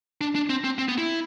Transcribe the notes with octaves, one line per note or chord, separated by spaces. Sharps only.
D4
D4
C4
C4
C4
B3
E4